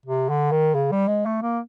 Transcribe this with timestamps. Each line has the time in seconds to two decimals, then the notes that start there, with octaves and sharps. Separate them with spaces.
0.06 C3
0.30 D3
0.52 D#3
0.75 C#3
0.92 G3
1.08 G#3
1.26 A3
1.42 A#3